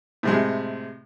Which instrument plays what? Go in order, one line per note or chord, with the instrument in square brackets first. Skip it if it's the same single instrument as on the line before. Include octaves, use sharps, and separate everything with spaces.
[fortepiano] A2 C3 G#3